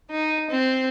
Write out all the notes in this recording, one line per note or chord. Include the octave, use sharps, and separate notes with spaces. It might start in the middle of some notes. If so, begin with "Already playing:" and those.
D#4
C4